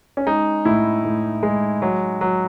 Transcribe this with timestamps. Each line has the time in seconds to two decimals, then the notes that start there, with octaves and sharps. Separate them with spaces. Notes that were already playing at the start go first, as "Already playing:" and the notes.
0.17 C#4
0.26 G#3 D#4
0.65 A2 E4
1.04 A2
1.43 G#3
1.82 F#3
2.21 F#3